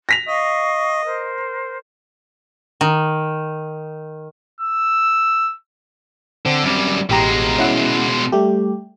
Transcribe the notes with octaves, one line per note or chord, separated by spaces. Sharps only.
A#6 B6 F7
D#5 F5 C#6
A#4 C5
D#3
E6
D3 C4
F#2 G3
A1 B2 G#3 G4 A#5
C#4 E4 F#5
G3 A3 G4